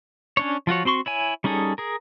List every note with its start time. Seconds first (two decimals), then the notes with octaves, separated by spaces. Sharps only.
0.37 C#4 D4 C#5
0.67 F3 F4 F#4 C#5
0.85 C4 F#4 C6 C#6
1.06 E4 C#5 G#5
1.44 G3 C#4 D#4 G#4 A4
1.78 G#4 A#4